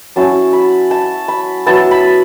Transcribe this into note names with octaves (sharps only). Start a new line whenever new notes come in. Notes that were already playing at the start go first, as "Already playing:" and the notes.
F#3 C#4 E4 A5
B5
A5
B5
F#3 B3 E4 A5
B5